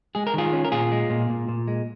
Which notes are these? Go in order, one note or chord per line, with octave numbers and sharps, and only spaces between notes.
G#3 G#4
A#4
D#3 F4 G#4
C#4
A#4
A#2 F4 G#4
G#3
A#2
A#2
A#2
G#3